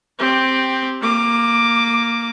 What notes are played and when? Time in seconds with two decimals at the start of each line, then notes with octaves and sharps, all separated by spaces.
0.19 C4 G4
1.01 A#3 D6